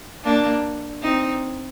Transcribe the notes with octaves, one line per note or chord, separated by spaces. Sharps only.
A#3 D4
C4 D#4